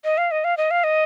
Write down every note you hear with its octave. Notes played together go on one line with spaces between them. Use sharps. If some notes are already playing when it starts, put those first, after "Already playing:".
D#5
F5
D#5
F5
D#5
F5
D#5